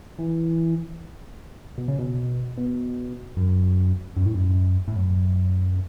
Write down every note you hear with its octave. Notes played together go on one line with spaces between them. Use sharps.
E3
B2
C#3
B2
B2
F#2
F#2
A2
F#2
A2
F#2